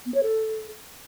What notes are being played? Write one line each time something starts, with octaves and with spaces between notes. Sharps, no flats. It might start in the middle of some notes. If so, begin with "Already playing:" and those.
B3
C#5
A4